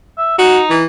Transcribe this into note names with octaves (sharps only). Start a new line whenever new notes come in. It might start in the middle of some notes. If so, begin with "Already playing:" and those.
E5
D#4 F#4
E3